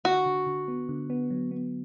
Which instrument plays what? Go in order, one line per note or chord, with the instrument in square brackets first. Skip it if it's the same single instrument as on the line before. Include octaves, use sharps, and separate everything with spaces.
[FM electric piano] D3 [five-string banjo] F#4
[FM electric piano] D3
D3
B3
D3
B3
F#3
B3